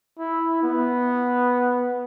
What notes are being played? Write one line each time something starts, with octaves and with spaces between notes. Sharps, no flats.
E4
B3